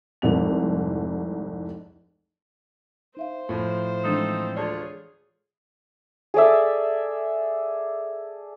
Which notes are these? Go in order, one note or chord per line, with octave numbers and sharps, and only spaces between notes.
F1 C2 G#2 F7
D#4 C5 E5 F5
A2 F3
E3 G#3 C4 D4 D#4 A4
D2 F4 G#4 C#5 D5 A5
G#4 A4 D5 E5